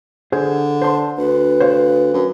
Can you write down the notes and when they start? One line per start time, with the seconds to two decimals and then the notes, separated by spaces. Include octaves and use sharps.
0.32 D3 G#4 C5
0.82 C5 A5 C6
1.17 D2 B4
1.61 C5 C#5 F5
2.13 F#2